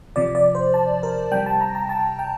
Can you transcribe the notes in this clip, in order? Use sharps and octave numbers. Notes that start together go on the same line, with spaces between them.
C3 F3 D5
D5
C5
A5
A#4
C3 G3 G5
A5
A#5
A#5
A5
G5